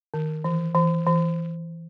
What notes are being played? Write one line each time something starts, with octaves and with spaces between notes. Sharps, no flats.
D#3
E3
E3
E3